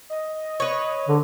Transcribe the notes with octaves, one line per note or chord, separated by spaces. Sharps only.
D#5
B4 C#5
G#2 D3